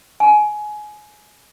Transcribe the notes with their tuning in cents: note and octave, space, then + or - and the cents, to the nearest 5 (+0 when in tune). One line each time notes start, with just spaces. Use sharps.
G#5 +20